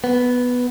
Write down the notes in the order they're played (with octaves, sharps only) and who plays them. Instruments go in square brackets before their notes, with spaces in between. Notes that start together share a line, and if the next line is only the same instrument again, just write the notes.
[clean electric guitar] B3